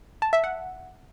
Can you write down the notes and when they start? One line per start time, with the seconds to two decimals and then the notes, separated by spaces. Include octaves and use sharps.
0.22 A5
0.33 E5
0.44 F#5